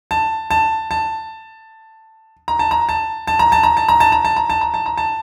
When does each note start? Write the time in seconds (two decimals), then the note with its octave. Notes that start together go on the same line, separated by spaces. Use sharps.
0.11 A5
0.51 A5
0.91 A5
2.48 A#5
2.59 A5
2.71 A#5
2.89 A5
3.27 A5
3.39 A#5
3.52 A5
3.63 A#5
3.77 A5
3.89 A#5
4.00 A5
4.12 A#5
4.25 A5
4.36 A#5
4.50 A5
4.61 A#5
4.74 A5
4.86 A#5
4.98 A5